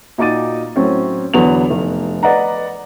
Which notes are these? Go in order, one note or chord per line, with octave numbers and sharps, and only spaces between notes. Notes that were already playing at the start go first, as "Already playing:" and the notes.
A#2 D#4 F#4 D6 A6 D#7
A2 F#3 C4 C#4
E2 D3 F#3 B3 F7
F1
B4 D5 D#5 F#5 A#5